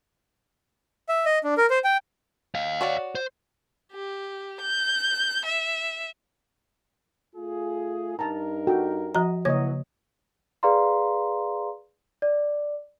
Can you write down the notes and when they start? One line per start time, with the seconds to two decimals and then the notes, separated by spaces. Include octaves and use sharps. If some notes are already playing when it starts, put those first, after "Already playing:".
1.09 E5
1.26 D#5
1.44 D4
1.58 A#4
1.70 C5
1.84 G5
2.55 D#5 F5
2.81 F#4 C#5 D5
3.15 C5
3.92 G4
4.61 G6
5.46 E5
7.36 A3 F4 G#4
8.19 G2 D#4 A#4 A5 A#5
8.67 F#4 A4 G5
9.15 F3 F#4 D#5 A#5
9.45 C#3 E3 F#3 A#3 C#5 D#5 G#6
10.63 G#4 B4 D5 F5 A#5 C6
12.22 D5